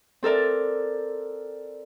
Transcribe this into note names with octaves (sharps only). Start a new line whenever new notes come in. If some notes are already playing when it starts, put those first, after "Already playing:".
C4 A4 A#4 D5